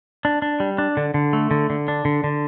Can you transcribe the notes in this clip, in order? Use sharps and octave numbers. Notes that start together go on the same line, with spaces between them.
D4
D4
G3
D4
D3
D3
A3
D3
D3
D4
D3
D3